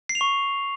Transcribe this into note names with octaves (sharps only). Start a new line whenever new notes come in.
C7
F7
C#6